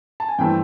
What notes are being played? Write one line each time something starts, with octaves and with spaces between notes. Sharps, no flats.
A5
G#5
G2 E3 A3 C4 G5